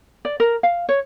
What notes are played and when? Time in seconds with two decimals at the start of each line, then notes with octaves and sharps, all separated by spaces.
0.25 D5
0.40 A#4
0.63 F5
0.89 C#5